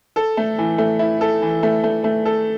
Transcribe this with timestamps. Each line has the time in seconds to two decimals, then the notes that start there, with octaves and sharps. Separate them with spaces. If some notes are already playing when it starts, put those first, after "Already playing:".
0.16 A4
0.37 A3
0.58 E3
0.78 A3
0.99 E4
1.21 A4
1.42 E3
1.63 A3
1.84 A3
2.04 A3
2.25 A4